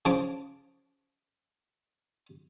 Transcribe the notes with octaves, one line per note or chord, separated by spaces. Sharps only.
C#3 F3 A5 D6